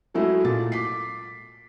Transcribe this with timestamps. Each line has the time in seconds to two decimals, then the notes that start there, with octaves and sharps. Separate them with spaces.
0.14 F#3 G#3 A3 E4 F#4
0.44 A#2 A#3 A6
0.72 D6 B6 C7